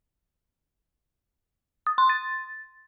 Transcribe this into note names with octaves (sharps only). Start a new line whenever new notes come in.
D#6
C6
A6